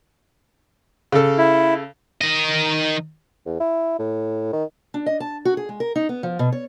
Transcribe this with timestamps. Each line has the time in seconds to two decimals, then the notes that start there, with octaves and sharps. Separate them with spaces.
1.12 C#3 A4
1.38 E4
2.21 D#3 D#5
3.46 E2
3.60 E4
3.99 A2
4.53 D#3
4.94 D4
5.06 D#5
5.20 A5
5.45 F#4
5.57 G#4
5.69 G#3
5.80 A#4
5.96 D#4
6.09 B3
6.23 F3
6.39 B2
6.52 C#5